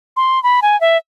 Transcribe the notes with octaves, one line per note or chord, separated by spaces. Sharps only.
C6
B5
G#5
E5